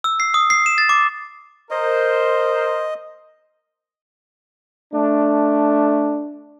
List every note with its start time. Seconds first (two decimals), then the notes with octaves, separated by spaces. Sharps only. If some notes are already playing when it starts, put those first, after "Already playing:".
0.04 E6
0.20 C7
0.34 D#6
0.50 C7
0.66 E7
0.78 A6
0.89 D6
1.70 A#4 C5 D#5
4.92 A3 D4